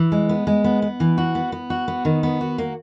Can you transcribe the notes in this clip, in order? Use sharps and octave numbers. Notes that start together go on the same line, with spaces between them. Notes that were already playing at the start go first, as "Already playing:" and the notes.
Already playing: E3
G#3
B3
G#3
B3
B3
E3
F#4
B3
B3
F#4
B3
D#3
B3
F#4
A#3